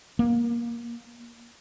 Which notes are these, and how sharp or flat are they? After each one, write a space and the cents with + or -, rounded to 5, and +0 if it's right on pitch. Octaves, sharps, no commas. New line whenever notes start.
A#3 +15